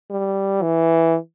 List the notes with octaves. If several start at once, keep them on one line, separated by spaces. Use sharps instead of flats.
G3
E3